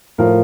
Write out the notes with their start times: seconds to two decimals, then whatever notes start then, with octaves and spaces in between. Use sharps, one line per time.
0.18 A2 F3 A#4